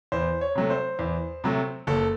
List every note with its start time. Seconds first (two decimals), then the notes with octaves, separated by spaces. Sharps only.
0.12 E2 C5
0.41 C#5
0.55 C3 F#3 A3
0.70 C5
0.99 E2
1.44 C3 F#3 A3
1.87 F#1 A4